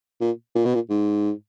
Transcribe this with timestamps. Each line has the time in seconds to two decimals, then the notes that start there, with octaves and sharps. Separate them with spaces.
0.21 A#2
0.55 A#2
0.65 B2
0.75 A#2
0.90 G#2